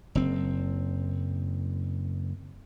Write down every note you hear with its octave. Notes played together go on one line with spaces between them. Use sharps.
F#1 C4